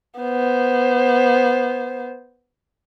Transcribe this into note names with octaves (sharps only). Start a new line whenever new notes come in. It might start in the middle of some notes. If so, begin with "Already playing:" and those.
B3 C5